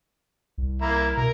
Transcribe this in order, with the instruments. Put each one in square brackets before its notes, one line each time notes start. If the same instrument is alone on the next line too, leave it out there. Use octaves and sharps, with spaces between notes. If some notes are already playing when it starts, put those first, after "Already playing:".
[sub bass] C2
[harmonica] A#3 E4 A#5
[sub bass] B2 [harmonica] A#4